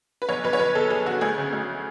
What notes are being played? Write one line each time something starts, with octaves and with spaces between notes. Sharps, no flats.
B4
B1 C#5
B1 B4
C#5
B1 B4
B1 A4
B1 G#4
B1 F#4
D2 G#4
C#3
D2